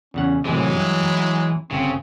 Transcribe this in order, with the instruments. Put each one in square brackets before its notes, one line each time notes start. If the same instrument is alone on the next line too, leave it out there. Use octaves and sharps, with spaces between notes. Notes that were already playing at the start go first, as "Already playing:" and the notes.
[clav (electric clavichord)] E2 C#3 F#5 [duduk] C#4
[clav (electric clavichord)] G#1 A2 C3 [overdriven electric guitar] E3 [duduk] F#3 [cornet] G#3
[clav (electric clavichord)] G2
E4
[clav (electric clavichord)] G1 [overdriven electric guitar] C#3 [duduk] C4